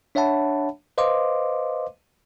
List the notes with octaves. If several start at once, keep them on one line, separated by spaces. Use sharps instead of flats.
D4 C#5 E5 F#5 A5 B5
B4 C5 D#5 F5 C6 D6